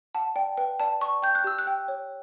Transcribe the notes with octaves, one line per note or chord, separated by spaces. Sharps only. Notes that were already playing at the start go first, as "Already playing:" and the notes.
F#5 A5
D5 G5
B4 G5
D5 A5
D5 C#6
G5 G6
F#6
G4 E6
F#6
G5
C#5